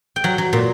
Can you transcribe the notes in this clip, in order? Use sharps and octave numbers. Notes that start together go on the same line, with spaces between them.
G5
F#3 F#5
F#3
A#2